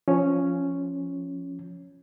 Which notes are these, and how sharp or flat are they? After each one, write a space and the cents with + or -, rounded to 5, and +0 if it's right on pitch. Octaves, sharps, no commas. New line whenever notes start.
F3 +0 C#4 +0